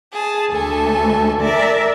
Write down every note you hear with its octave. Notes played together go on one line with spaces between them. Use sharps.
G#4 A5
D2 A4 G#5
A#4 D5 E5